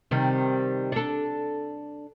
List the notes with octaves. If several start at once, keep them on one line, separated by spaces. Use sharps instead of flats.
C3 D#3 G3
D4 A4